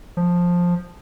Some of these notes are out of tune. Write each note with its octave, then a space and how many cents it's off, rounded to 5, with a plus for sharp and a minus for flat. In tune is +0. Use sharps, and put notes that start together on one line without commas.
F3 +10